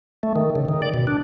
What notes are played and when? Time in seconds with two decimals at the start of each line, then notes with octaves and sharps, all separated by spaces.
0.23 A3
0.36 D#3
0.55 C#3
0.69 D#3
0.82 D5
0.94 B2
1.07 D4